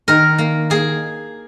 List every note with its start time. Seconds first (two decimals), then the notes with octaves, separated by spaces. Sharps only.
0.08 D#3 A#4
0.38 A#3
0.70 A#3 G#4